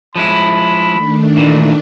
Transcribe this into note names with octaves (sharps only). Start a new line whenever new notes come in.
F3 G#3 E4 B5
D#3 A3 D4
A#2 E3